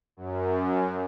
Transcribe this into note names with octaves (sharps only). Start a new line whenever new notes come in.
F#2